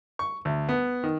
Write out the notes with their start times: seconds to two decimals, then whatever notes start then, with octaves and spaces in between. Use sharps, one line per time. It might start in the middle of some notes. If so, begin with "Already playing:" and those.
0.19 C#6
0.45 D2
0.69 B3
1.04 D#3